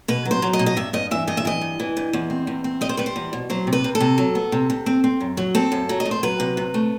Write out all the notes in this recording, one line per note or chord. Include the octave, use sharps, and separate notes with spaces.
B2 B4
F#3
C5
F#3
D#5
B2
D#5
G2 E5
G2 D#5
E3 E5
G2 D#5
E5
E3 D#5
G2
E3
G2
E2
C4
E2
C4
G3 D#5
C5
G3 B4
C5
E2
B2
F#3 C5
C3
B4
C3
A4
C3
F#3
B3
C3
C3
C4
C4
F#2
F#3
C4 A4
F#2
F#3
D#5
A3
C5
F#3 B4
C3
C3
A3